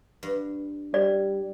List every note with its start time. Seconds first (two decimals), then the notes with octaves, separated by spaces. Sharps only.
0.23 G2
0.94 G3 D5